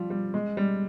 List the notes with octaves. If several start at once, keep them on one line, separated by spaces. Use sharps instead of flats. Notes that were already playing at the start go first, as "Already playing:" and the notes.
Already playing: F3 G3
G3
G#3
G3